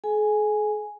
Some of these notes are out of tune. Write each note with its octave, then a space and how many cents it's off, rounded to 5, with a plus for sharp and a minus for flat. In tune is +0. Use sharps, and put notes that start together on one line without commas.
G#4 +45 G#5 +0